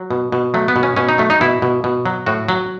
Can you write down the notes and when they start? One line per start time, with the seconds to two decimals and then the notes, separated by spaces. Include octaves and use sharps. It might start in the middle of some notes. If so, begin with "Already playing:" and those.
Already playing: F#3
0.11 B2
0.32 B2
0.54 F#3 A3
0.68 B3
0.76 B2
0.83 C#4
0.97 B2 C#4
1.09 D#4
1.18 F#3 A3
1.30 D#4
1.41 B2 E4
1.62 B2
1.84 B2
2.06 F#3
2.26 A2 F#4
2.48 F#3